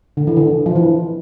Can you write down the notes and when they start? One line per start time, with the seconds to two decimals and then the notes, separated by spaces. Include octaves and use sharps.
0.17 D3
0.27 E3
0.37 D3
0.66 F3
0.76 E3